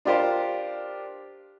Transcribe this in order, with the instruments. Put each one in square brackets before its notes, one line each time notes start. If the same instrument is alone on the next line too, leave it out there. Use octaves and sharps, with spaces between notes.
[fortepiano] D4 F4 G4 A#4 C5